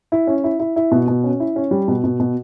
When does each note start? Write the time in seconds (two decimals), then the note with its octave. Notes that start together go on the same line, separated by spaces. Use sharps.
0.12 E4
0.27 C#4
0.44 E4
0.60 E4
0.76 E4
0.91 B2
1.08 B2
1.24 C#4
1.40 E4
1.56 C#4
1.71 G3
1.88 B2
2.04 B2
2.20 B2